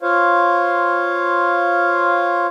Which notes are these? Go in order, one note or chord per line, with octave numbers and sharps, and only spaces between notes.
F4 C5 C#5 F5